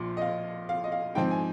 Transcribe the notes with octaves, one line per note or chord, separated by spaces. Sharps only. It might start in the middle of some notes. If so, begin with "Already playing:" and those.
Already playing: A#1 A#2 F3
D#5
F5
F5
D#5
F5
G#2 F3 C4 G5
G#5